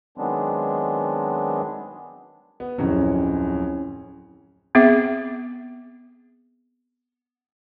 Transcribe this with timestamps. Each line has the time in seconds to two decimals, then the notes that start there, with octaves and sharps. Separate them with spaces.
0.18 D#3 F#3 G#3 B3 C4 D4
2.60 B3
2.78 D1 F2 F#3 C4 C#4 E4
4.75 B3 C4 G#4 E5 D6